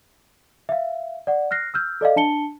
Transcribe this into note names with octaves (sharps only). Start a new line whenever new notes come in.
E5 F5
D5 F#5
F6 F#6 A#6 C7
E6 F6 G6
A4 D5 D#5 F5
D4 A5 C#7 G7